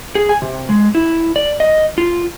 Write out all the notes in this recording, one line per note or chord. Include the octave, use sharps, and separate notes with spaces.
G#4
G#5
C3
G#3
E4
D5
D#5
F4